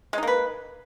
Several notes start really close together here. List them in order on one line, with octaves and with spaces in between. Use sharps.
G#3 D#4 A#3 B4